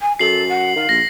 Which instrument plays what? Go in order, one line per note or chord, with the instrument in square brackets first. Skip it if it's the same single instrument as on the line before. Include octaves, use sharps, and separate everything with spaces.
[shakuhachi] G#5
[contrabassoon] F#2 [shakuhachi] A4 [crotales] C7 F#7
[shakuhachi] F#5
[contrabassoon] D#3 [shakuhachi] F5
[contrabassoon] A#1 [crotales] A#6